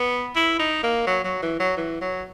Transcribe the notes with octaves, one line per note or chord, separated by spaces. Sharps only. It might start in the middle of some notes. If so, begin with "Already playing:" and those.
Already playing: B3
E4
D#4
A#3
F#3
F#3
E3
F#3
E3
F#3